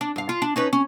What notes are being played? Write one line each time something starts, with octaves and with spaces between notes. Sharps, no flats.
D4
G2 F5
F4
D4
C#4 D#4 B4
C#4